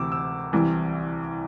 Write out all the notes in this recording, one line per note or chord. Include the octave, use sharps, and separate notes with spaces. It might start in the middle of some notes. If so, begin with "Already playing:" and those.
Already playing: D2 C3 E3 D6 E6
E6
C2 C3 E3